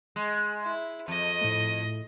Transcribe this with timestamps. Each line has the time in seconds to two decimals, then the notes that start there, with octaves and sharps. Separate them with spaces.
0.16 G#3
0.63 E4
1.08 F2 D#5
1.41 A2 A3